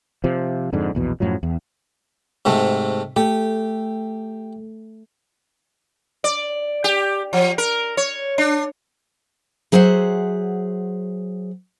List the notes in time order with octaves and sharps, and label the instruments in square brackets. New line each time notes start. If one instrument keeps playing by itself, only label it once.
[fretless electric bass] C3 F3
F2 G#2 D3
A#1 E2 B2
F#2 A2 F3 F#3
E2
[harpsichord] G#2 C3 A3
[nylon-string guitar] A3 [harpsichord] G4
[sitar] D5
G4
F3
A#4
C#5
D4
[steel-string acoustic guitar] F#3 G#4 C5 E5 F#5